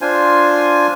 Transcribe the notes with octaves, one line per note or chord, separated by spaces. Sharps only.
D4 F4 C5 G#5